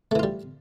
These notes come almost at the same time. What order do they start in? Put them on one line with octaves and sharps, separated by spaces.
A3 E3 F4 G3